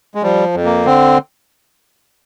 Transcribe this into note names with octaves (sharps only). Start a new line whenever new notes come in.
G#3
F3 G3
F2
A#3
D3 C4